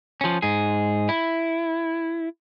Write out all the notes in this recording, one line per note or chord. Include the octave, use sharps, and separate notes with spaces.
F3 C#4
G#2 G#4
E4